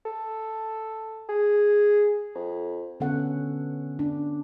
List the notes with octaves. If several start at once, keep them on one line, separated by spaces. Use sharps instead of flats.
A4
G#4
F2
D3 B3 C#4 A4 F#5
D4